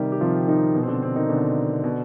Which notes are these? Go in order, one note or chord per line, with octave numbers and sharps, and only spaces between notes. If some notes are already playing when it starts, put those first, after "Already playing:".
Already playing: C3 D#3 G3 G4
G4
C3 F3 F4
D#3 D#4
B2
C4
D3 D4
C4
D#3 D#4
B2 D3 D4
B2